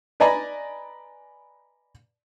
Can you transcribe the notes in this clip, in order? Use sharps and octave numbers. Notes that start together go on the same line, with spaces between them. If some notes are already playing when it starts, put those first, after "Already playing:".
B4 D5 D#5 G#5 A#5 B5